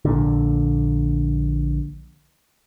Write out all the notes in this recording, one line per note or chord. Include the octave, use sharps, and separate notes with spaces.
A#1 A#2 D3